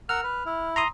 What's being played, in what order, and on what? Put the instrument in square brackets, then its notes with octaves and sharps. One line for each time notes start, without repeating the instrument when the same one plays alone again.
[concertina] A#4 F#5 E6 [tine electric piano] F6
[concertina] B4
E4
[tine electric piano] A#5 C6 D#6